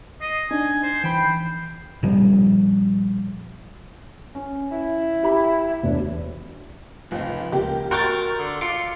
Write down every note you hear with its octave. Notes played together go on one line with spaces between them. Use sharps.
D#5 C7
D4 D#4 G#5
C5
E3 G5 B5 C7
A#2 F3 G3
C#4
E4
G4 B5
E1 D4
F1 C#2
C#2 A#3 G4
F#4 A#4 G5 C6 C#6 A6
D3
F4 D6 C#7